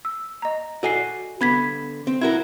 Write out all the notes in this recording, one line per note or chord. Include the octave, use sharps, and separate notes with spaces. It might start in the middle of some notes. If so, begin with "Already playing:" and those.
E6
D#5 A#5
F#4 A4 D5 D#5 G#5 C7
D3 B3 B5 G#6 B6
C4
E4 F#4 A#4 G#6